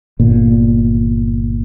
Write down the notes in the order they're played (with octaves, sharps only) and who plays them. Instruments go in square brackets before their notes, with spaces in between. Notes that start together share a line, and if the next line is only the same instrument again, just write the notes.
[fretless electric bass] G1 A#2